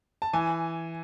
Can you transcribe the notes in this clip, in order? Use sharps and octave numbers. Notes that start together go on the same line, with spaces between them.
A5
E3 G#5